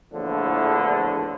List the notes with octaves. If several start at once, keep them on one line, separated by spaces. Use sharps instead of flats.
A#1 E2 A2 D3 F3